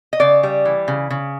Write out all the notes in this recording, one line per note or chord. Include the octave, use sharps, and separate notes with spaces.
D#5
C#3 D5
G3
E3
C#3
C#3